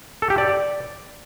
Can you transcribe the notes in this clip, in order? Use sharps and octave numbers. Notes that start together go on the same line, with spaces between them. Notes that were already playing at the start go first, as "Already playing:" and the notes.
A4
G4
D5